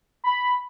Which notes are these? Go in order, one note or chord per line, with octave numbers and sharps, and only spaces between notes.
B5